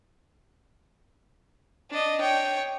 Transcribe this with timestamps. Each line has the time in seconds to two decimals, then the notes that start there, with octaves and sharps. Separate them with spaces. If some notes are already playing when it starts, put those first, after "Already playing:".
1.91 D4 D#5
2.21 C#5 G5